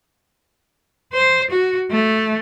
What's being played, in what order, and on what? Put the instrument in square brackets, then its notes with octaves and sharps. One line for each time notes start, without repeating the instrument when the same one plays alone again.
[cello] C5
F#4
A3